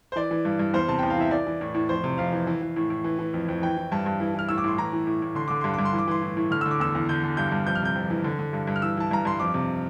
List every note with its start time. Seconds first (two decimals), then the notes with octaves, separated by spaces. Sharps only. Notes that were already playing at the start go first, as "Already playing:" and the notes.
0.12 C5
0.16 E3 D5
0.31 E3
0.45 G2
0.59 G2
0.73 E2 C5
0.88 C3 A5
0.99 E2 G5
1.10 F5
1.18 E3 E5
1.31 E3 D5
1.47 E3
1.61 A2
1.74 A2
1.89 F2 C5
2.04 C3
2.18 F2 F5
2.32 E3
2.47 E3
2.62 E3
2.76 A2
2.90 A2
3.04 E3
3.19 E3
3.34 F2
3.48 F2
3.62 E3 G5
3.77 E3
3.92 G2 A5
4.06 G2
4.20 E3
4.35 E3 F6
4.49 A2 E6
4.58 D6
4.64 A2 C6
4.78 E3 A#5
4.93 E3
5.07 A2
5.22 A2
5.35 D3 C6
5.48 D3 D6
5.61 G2 C6
5.74 G2 D6
5.85 C6
5.93 E3
5.99 D6
6.08 E3 C6
6.22 A2
6.37 A2
6.51 D3 F6
6.61 D3 E6
6.71 D6
6.80 E2 E6
6.95 E2
7.09 D3 G6
7.23 D3
7.37 G2 G6
7.52 G2
7.66 F2 G6
7.75 F6
7.82 C3 G6
7.95 F2
8.10 E3
8.24 D3
8.39 D3
8.53 G2
8.67 G2
8.76 F6
8.82 E3 E6
8.97 E3 A5
9.11 G2 A#5
9.25 G2 C6
9.40 F2 D6
9.54 C3